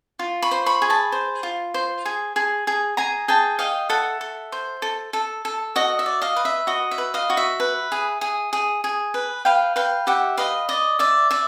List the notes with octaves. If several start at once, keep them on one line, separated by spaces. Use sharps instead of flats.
F4
B5 C#6
C5
B5 C#6
G#4
A5 B5
C5
F4
C5
G#4
G#4
G#4
G#4 G#5 A#5
G#4 G5 A5
D#5 F5 G5
A4 E5 F#5
A4
C5
A4
A4
A4
F#4 D#5
E5
D5
D#5 F5
B4
E5
F#4 D#5
E5
B4
D#5 F5
F#4
E5
B4
G#4
G#4
G#4
G#4
B4
B4 F5 G5
B4 F5 G5
G4 E5 F#5
B4 D#5 F5
D5 D#5
D5 E5
D5 E5